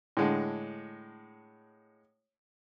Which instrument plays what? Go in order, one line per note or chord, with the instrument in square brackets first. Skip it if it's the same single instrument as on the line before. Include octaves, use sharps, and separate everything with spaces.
[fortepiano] A2 D3 G#3